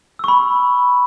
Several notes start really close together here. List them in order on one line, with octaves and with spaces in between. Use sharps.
E6 C#6 B5